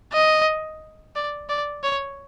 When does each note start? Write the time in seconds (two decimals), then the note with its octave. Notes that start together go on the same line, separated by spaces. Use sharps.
0.13 D#5
1.15 D5
1.49 D5
1.83 C#5